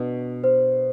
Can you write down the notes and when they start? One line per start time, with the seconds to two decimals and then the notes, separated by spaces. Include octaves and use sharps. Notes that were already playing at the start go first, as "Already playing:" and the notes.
Already playing: B2 D4
0.44 C5